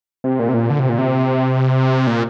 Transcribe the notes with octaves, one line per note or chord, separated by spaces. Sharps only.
C3
A#2
C3
A#2
D3
C3
A#2
C3
A#2